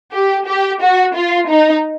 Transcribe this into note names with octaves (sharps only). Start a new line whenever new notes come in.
G4
G4
F#4
F4
D#4